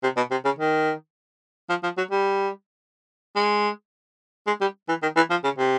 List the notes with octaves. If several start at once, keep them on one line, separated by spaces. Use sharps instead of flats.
C3
B2
C3
C#3
D#3
F3
F3
F#3
G3
G#3
G#3
G3
E3
D#3
E3
F3
C#3
C3